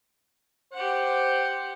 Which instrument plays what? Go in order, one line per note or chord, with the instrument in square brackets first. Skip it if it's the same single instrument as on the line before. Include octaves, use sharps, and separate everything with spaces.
[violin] G4 F#5 [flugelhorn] C5